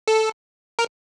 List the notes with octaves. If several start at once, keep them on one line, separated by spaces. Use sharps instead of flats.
A4
A#4